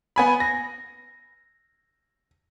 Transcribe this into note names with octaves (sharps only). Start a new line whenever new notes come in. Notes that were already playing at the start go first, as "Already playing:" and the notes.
B3 G#5 B5
A#6